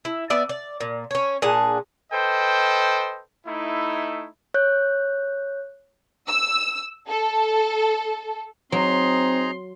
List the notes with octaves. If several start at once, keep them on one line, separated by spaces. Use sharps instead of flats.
E4
B3 D5 E5
D5
A#2
C#4 C#5
A#2 D4 G#4 F#5
A4 B4 C5 D#5 G5
A3 D#4 E4
C#5 F#6 G6
E6
A4
F#3 C4 D#4 G#4 A#5 C6